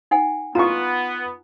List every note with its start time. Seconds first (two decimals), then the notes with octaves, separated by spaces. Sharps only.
0.11 D#4 F#5 G#5
0.55 B3 F4 A#5 C#6